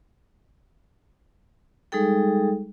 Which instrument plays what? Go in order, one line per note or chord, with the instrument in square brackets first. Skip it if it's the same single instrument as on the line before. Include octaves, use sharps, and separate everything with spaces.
[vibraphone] G3 G#3 D#4 G#4 A4 G5